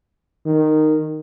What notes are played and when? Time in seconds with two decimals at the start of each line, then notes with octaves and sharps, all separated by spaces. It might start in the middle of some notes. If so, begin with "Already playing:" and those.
0.46 D#3